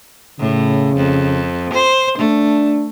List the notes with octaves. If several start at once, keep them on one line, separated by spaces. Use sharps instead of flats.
A2 C#3
F2
C5
A3 D4